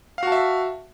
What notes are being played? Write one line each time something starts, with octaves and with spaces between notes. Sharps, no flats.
F#4 E5 F5 A5